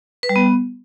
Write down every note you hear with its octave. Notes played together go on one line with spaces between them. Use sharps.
B4
G3
B3